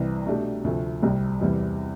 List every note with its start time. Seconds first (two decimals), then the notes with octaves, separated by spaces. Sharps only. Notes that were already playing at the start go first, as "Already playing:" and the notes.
Already playing: C2 C3 E3
0.26 B2 A3 D4 G4
0.64 D2 C3 F3 A3
1.02 C2 C3 G3
1.41 E2 C3 E3 G3